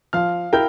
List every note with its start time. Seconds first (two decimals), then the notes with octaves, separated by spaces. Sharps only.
0.13 F3 F5 F6
0.53 E4 A#4 G5 G6